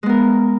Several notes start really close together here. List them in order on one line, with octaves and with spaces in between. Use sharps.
G#3 B3 A#4